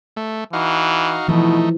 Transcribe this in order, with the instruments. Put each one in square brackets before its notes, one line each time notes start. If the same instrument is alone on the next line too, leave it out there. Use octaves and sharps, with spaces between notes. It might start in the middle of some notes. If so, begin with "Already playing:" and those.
[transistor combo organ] A3
[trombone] E3 [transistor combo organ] D#4 F#4 F5
[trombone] B2 [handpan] E3 F3 E4 [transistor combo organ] A3 D#4